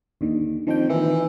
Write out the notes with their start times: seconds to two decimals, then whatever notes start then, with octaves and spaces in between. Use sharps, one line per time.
0.21 D#2 D3 D#3
0.67 F2 D#3 G5
0.89 A#2 D#3 E3